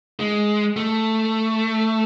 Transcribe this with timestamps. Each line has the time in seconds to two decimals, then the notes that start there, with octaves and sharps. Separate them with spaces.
0.20 G#3
0.76 A3